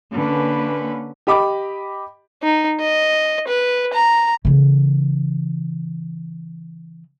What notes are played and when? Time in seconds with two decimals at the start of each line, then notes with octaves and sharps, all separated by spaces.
0.14 D3 A#3 C#4 B4
1.27 G4 D#5 B5 D6
2.43 D#4
2.80 D#5
3.48 B4
3.93 A#5
4.45 C#3 E3